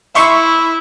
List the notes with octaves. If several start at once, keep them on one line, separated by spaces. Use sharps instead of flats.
E4 E5 C6 C#6